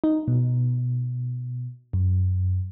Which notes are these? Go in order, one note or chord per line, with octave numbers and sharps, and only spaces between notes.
D#4
B2
F#2